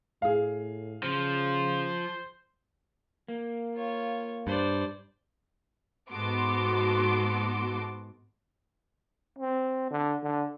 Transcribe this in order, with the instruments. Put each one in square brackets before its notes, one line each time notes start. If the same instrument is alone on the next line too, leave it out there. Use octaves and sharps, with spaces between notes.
[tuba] A2 [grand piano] G#4 F5
[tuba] C#3 [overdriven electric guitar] F3 [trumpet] C5
[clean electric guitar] A#3
[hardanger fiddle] F4 C#5
[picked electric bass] G2 [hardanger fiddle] C5 D5
[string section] G#2 B3 F#4 A4 C6 D6
[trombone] C4
D3
D3